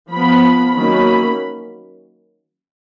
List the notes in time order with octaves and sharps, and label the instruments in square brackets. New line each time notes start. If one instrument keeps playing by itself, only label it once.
[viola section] F3 B3 B5
D#3 F#3 A#3 C#4 B5